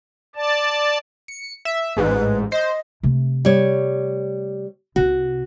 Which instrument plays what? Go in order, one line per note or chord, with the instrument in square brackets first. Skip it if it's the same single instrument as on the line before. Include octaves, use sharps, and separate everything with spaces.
[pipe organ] D5 A5
[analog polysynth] C#7
E5
[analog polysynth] A1 G#2 [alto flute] B4
[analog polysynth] C5 [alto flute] D#5
[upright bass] C3 A3
[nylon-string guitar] G3 C#5
[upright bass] C2 C3 [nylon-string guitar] F#4